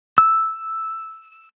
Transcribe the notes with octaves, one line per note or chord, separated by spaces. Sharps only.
E6